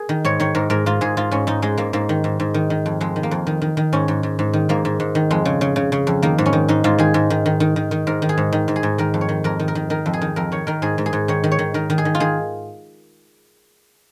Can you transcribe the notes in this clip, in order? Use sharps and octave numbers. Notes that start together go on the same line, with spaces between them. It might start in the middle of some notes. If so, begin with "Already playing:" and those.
Already playing: G#4 A#4
D#3
G#2 C#5
D#3 C#5
G#2 A#4
G#2 A#4
G#2 F4
G#2 G#4
G#2 F4
G#2 C#4
G#2 D#4
G#2 G#3
G#2 A#3
G#2 A#3
D#3
G#2
G#2
D#3
D#3
F2
F2 G#3
D#3
A#3
F2
D#3
D#3
D#3
G#2 C#4
G#2
G#2
G#2
D#3
G#2 A#3
G#2
G#2
D#3
F2 G#3
C#3
C#3
C#3
C#3
F2
D#3 A#3
G#2
C#4
D#3
G#2 D#4
G#2 F4
D#3 G#4
G#2
D#3
D#3
D#3
D#3
D#3
G#2 A#4
D#3
G#4
G#2
D#3
G#2
G#4
G#2
D#3 A#4
F2
C#5
D#3
F2 A#4
D#3
A#4
D#3
D#3 A#4
F2
G#4
D#3
F2 A#4
D#3 C#5
D#3 A#4
G#2 G#4
G#2
G#4
G#2
D#3 C#5
D#3
C#5
D#3
D#3 A#4
D#3
G#4
D#3
F4
D#3 G#4